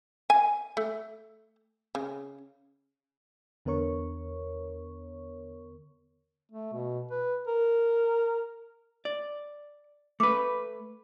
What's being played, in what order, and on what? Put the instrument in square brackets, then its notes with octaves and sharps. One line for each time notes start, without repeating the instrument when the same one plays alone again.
[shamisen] G#5
A3
C#3
[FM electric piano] E2 D3 B3 A#4 C#5 C#6
[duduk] A3
B2
B4
A#4
[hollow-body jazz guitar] D5
[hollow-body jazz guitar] A3 B4 [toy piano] D6